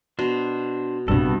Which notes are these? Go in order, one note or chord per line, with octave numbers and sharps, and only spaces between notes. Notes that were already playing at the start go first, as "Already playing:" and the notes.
B2 D4 C5
A#1 G2 C3 B3 A4